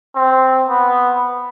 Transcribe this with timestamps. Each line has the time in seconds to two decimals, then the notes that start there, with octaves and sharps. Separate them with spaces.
0.15 C4
0.68 B3